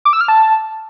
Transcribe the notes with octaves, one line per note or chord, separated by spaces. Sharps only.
D6
E6
F6
A5